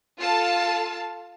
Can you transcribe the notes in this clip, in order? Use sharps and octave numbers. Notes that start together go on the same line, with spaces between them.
F4 A4 F5 A5